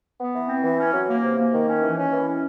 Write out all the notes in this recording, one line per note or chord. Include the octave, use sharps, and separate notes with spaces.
B3
E3
C4
E3
C#4
F#3
A#3
C3
A#3
D#3
C#4
E3
C#4
E3
C#4